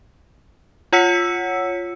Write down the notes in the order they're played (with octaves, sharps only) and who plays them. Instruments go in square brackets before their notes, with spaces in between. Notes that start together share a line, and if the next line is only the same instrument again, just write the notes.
[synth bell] F4 C#5 F#5 E6 B6 C#7